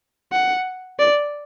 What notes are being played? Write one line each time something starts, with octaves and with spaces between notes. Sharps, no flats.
F#5
D5